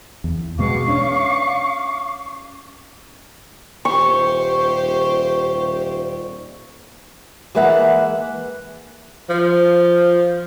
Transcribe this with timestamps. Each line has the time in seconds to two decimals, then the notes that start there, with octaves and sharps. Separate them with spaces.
0.24 E2
0.59 B2 G#3 B3 F5 C#6 D6
0.88 C#4 D4
3.85 D#1 G4 C5 C#6
7.55 E3 G#3 A#3 B4 E5 F#5
9.30 F3